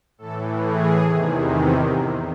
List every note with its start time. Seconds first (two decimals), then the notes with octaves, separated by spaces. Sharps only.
0.18 A2 E3 A4
0.62 G#4
1.04 E2 C3 D#3